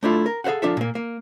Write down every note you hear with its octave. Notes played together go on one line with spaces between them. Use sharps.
A3 D4 E4 F4 A4
A#4
G#4 A4 C5 F5 F#5
F3 D4 F4 A4 E5
A#2 A#3
A#3